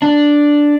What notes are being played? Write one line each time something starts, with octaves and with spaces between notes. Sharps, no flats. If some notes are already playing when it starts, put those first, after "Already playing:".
D4